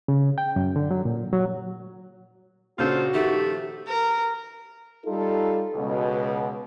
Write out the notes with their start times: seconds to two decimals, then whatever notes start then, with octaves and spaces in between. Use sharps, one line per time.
0.08 C#3
0.38 G5
0.56 F#2
0.76 D3
0.91 F#3
1.05 A#2
1.33 F#3
2.79 A#2 C#3 D4 F4 F#4 A4 C5
3.14 D#3 F3 A3 G4 E5
3.88 A#4
5.06 G3 D#4 F4 A4
5.75 C#2 B2